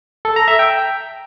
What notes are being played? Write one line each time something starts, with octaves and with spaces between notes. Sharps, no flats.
A4
A#5
E5
G5